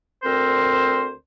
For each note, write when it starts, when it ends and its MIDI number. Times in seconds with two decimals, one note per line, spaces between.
0.23 1.11 38
0.23 1.11 60
0.23 1.11 70
0.23 1.11 72